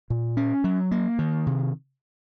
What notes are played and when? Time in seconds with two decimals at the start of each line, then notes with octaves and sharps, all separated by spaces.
0.10 A#2
0.37 C#4
0.64 F#3
0.91 A#3
1.19 D#3
1.47 C3